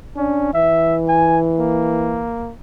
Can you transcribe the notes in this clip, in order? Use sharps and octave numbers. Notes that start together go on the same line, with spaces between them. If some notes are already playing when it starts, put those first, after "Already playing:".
C#4 D4
E3 E5
G#5
A#3